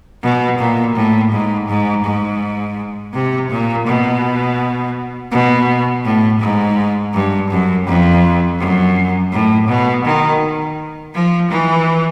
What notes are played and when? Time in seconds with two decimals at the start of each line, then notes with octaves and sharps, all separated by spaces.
0.23 B2
0.59 A#2
0.95 A2
1.31 G#2
1.68 G#2
2.04 G#2
3.13 C3
3.50 A#2
3.87 B2
5.32 B2
6.05 A2
6.40 G#2
7.13 G2
7.50 F#2
7.86 F2
8.60 F#2
9.32 A2
9.68 B2
10.05 D#3
11.14 F3
11.51 E3